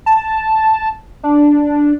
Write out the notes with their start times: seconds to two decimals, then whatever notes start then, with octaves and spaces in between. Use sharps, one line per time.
0.06 A5
1.24 D4